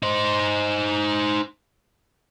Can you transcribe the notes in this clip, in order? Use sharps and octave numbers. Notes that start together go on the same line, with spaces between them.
D#4 C5